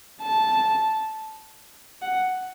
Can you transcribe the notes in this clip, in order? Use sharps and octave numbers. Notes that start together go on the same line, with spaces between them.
A5
F#5